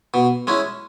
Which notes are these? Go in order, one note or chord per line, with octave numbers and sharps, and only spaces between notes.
B2
G#3 C#4 E4